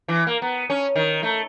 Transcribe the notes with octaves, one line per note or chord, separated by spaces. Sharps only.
E3
A#3
B3
C#4
D#3
A3